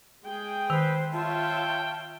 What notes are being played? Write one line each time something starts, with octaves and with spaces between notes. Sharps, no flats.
G#3 G#4 G5
D#3 B4 C5
F4 C#5 E5 G5 A5